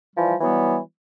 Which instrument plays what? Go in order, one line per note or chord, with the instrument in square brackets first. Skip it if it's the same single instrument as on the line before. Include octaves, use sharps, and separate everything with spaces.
[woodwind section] E3 F3 G3
E3 F#3 G3 B3